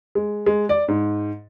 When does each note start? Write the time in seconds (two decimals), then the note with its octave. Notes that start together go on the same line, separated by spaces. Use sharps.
0.15 G#3
0.46 G#3
0.69 D5
0.88 G#2